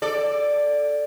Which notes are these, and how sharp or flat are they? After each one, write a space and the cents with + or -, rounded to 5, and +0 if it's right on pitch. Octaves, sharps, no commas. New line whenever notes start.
A4 +0 D5 +0